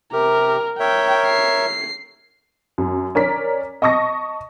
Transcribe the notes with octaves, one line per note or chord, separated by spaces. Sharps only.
C3 G4 A#4
A#4 C#5 E5 G5
C7
F#2
C#4 A#4 D5 B6
D#5 A5 C#6 D#6 A#6